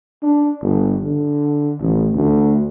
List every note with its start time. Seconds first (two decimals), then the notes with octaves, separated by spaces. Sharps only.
0.22 D4
0.62 G1
1.03 D3
1.80 A1
2.14 D2